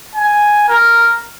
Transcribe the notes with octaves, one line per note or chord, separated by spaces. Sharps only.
G#5
A#4